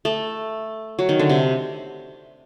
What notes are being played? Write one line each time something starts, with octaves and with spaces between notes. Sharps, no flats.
A3
F#3
D#3
D3
C3